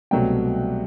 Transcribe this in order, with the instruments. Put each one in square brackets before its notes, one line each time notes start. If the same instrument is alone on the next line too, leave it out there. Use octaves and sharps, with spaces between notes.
[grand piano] C2 B2 F#3 A3 C4 G5